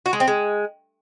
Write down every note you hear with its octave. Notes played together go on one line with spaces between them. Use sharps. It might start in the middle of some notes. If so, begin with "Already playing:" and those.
F#4
G#3
C4
G#3